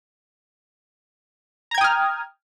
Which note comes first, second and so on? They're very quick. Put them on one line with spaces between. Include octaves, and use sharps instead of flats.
A#5 G#6 G5 D#6 F6